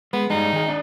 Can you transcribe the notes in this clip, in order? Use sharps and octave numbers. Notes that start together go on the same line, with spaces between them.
G#3 B3
G2 G3 G#3 D#4
D#3 G#4
D4 D#5